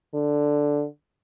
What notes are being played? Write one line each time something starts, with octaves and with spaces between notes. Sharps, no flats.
D3